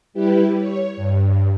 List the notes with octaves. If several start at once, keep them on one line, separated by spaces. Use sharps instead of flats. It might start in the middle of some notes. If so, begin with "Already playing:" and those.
G3 E4 G4 B4
C#5
G2